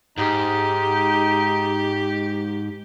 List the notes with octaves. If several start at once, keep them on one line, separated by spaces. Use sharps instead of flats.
G#2 D#4 G4